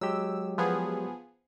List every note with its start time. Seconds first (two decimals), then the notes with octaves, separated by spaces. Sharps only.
0.01 F#3 G#3 G4 E6
0.58 F3 B3 G#4